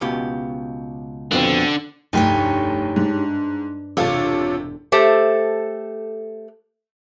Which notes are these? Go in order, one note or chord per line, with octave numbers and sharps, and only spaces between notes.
C#2 B2 G4
F2 B2 D3 C4
F1 D2 G2 D#4 G4 C#5
G#2 D4 B4
E1 C3 D4 F4 A4 C#5 E6
A3 G4 A4 C5